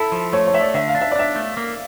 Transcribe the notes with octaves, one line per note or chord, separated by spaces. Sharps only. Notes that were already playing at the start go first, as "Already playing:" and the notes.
Already playing: E4 A4
F3
A3 C#5
C#5
A3 E5
D5
D3 E5
F5
D4
E5
D5
D4 E5
A3
A#3